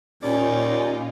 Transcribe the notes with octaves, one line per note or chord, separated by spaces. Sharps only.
D#2 A#2 C#4 D#4 F4 D5